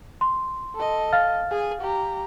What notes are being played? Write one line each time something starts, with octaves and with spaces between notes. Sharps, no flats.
C6
A4 D#5
F5 F6 A6
G#4 G#5
G4 A#5